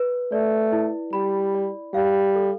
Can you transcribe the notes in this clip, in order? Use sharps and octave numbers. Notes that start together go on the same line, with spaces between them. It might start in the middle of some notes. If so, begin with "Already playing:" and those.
Already playing: B4
A3 D5
E4
G3 B5
D5
G3 F5
A4